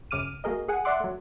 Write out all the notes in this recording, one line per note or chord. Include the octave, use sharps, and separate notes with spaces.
F#2 C#3 D6 F6 D#7
A3 A#3 F#4 G#4 A#4 D#5
G#4 F#5 G#5
D5 E5 F#5 C6 D6 F#6
F#3 A3